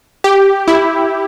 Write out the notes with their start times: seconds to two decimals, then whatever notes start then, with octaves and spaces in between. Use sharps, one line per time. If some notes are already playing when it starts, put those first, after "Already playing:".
0.24 G4
0.68 E4